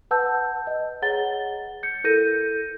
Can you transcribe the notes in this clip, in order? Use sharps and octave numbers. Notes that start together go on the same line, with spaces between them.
B4 F#5 A5 E6 G6
D#5
G#4 C#5 F#5 A#5 A6 G7
G6 C#7
E4 A4 A#4 G6 A#6 D#7